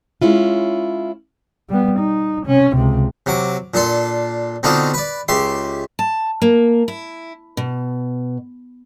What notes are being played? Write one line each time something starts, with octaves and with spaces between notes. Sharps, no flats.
G#3 C#4 E4 F4
G3 B3
D#4
C3 C#4
C#2 C3
C3 F#3 D6
A#2 D4 A4 C6
B2 D3 C4 D4 D#4 F4
B4 D5
C#2 G4 E5 C6
A5
A#3
E4
B2